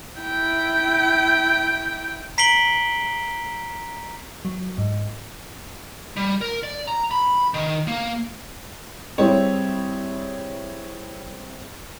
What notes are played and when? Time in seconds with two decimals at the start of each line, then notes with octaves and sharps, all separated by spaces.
0.21 E4 G5
2.38 A#5 B6 C7 D7 F#7 G7
4.45 F#3
4.78 G#2
6.17 G3
6.41 A#4
6.63 D5
6.87 A#5
7.11 B5
7.54 D#3
7.88 A#3
9.18 G3 C4 E4 G#4 C#5